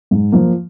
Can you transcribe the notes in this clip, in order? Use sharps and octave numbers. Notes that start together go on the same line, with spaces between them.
G#2
F3 A#3